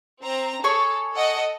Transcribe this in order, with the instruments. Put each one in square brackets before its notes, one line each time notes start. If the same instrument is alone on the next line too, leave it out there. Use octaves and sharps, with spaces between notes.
[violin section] C4 A#5
[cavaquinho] G#4 C#5 C#6 [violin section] A4
[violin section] A4 D#5 F#5